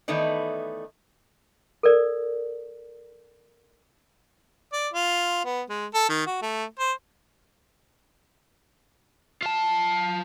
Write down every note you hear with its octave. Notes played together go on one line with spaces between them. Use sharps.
D#3 E3 A3 B3 D#4 D5
A4 A#4 D5
D5
F4
B3
G#3
A4
D#3
F#4
A3
C5
F4 A5